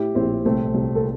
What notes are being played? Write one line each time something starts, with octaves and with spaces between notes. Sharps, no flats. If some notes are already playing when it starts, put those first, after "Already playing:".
Already playing: A2 E4 G4
A#1 C4 E4
C2 A3 C4
C2
A4